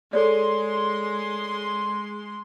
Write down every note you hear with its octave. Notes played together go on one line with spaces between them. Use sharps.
G#3 A4 C#5 D5 C6